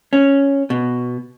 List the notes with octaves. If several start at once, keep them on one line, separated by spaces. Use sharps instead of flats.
C#4
B2